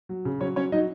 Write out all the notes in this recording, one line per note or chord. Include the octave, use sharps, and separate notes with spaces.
F#3
C#3
F#3 C#4 C#5
F#3 C#4 C#5
F#3 D#4 D#5